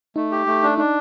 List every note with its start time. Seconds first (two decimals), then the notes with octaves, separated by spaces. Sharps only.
0.16 A3 D#4
0.32 G4
0.47 A3
0.63 D4
0.78 D4 D#4